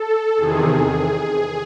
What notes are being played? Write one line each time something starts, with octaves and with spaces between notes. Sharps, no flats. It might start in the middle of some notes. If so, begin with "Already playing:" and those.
Already playing: A4
E2 C3 D#3 G#4